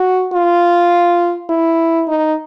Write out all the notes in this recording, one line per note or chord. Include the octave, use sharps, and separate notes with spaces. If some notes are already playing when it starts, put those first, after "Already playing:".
Already playing: F#4
F4
E4
D#4